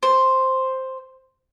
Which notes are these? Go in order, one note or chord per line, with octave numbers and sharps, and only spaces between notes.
C5